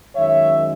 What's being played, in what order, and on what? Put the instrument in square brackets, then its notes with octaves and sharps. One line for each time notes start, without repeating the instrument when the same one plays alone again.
[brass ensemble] F#2 D#3 G#3 C#5 E5